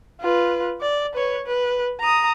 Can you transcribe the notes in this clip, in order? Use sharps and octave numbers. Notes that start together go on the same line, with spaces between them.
F4 B4
D5
B4 C#5
B4
A#5 D#6